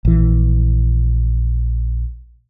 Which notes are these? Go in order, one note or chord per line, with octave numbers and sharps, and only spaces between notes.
A#1 E3